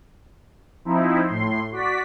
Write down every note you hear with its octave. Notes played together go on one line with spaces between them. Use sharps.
F3 C4 D#4 E4
A2 C6
F#4 D5 B6